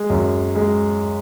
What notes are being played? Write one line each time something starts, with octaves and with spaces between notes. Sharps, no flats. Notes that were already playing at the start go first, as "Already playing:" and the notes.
Already playing: G#3
F#2
G#3